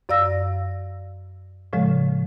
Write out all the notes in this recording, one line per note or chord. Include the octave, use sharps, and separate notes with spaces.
F#2 D5 F5 E6 A#6
A2 C#3 F3 G#3